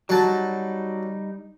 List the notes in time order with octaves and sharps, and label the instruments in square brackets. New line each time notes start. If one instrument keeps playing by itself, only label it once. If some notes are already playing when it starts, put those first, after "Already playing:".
[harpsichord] F#3 A5 [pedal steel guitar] G3 D#4